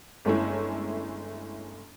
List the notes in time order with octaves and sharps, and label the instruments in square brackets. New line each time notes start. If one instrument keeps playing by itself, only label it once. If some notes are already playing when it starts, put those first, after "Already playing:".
[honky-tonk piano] G1 G#3 A3 C#4 E4